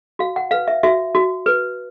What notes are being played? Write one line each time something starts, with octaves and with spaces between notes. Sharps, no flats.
F#4 F5
F#5
B4 F5
E5
F#4 E5
F#4
B4